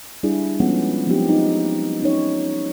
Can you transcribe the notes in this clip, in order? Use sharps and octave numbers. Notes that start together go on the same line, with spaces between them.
G3 D4 E4 G#4
F3 G3 G#3 B3 C#4 F#5
F3 F#3 B3 C4 D#4 G4
D#4
C#4 D#4 C#5